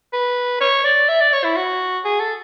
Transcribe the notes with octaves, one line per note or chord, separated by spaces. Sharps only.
B4
C#5
D5
E5
D5
C#5
E4
F#4
G#4
A4